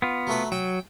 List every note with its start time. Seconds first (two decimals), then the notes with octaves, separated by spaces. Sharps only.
0.02 B3 F4
0.27 F#3 A3 B4
0.52 F#3 G5